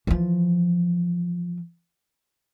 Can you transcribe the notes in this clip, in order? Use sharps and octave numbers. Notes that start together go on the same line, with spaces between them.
E3 F3